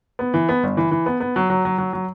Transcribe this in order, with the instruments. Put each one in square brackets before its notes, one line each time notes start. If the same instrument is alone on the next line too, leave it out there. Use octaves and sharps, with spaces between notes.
[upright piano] B3
E3
B3
G1
E3
E3
B3
B3
F#3
F#3
F#3
F#3
F#3